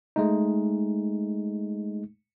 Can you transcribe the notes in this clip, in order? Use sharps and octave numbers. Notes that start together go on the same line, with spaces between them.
G#3 A3 D#4